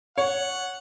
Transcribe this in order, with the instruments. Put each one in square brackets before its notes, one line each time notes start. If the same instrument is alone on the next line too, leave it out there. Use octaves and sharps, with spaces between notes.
[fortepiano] C#5 [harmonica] F#5